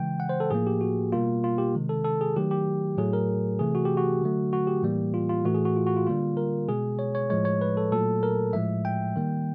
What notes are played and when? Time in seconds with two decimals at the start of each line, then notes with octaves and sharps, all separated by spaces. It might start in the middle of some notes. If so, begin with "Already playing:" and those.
Already playing: C#3 E3 G#3 G5
0.20 F#5
0.29 C5
0.40 A4
0.51 A2 F3 A#3 G#4
0.67 G4
0.81 F#4
1.12 B2 G3 A#3 F4
1.44 F4
1.58 G4
1.75 C3 D#3 G#3
1.89 A4
2.05 A4
2.21 G#4
2.36 D#3 F#3 A3 G4
2.51 G4
2.97 A2 F#3 A3 G#4
3.13 A#4
3.59 C3 E3 A3 G#4
3.75 F#4
3.85 G4
3.97 F#4
4.22 D3 F#3 A3
4.53 F#4
4.67 G4
4.83 A2 E3 G3 A#3
5.14 F4
5.29 F4
5.45 A2 E3 A3 F#4
5.55 G#4
5.65 F#4
5.76 F4
5.87 F#4
5.96 F4
6.07 D3 G3 A#3 F4
6.37 A#4
6.68 B2 G#3 G#4
6.99 C#5
7.15 C#5
7.30 A2 F3 G#3 C#5
7.45 C#5
7.61 B4
7.77 A4
7.92 A#2 F#3 A3 A4
8.23 A#4
8.53 A2 F3 G#3 E5
8.85 G5
9.16 D#3 G3 A#3